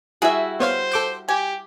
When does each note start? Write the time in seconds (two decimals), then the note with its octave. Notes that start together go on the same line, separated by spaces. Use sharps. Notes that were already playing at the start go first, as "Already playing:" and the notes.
0.22 G3 E4 F#4 G#4 E5
0.60 B3 C5 C#5 F5
0.92 A4 D6 G6
1.28 G4 G#5